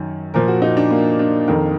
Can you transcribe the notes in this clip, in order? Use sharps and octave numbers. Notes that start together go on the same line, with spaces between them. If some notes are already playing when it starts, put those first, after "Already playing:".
Already playing: F#2 D#3
A#2 F3 A#4
F#4
D#4
D4
A#3
D4
F2 D#3 A#4